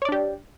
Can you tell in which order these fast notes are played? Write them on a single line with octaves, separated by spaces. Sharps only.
C#5 D5 D4 G4